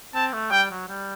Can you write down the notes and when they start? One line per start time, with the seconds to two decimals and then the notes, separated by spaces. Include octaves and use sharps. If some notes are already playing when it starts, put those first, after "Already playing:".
0.14 C4 A5
0.33 A3
0.51 G3 G5
0.70 F#3
0.88 G3